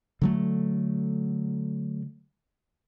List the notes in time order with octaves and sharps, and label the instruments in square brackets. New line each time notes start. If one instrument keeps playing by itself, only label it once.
[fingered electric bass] D3 F#3 A3